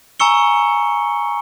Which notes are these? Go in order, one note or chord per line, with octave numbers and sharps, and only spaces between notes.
G#5 A#5 C#6 E6 C#7 G7